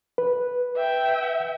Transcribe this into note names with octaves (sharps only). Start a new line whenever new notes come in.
B4
E5 G5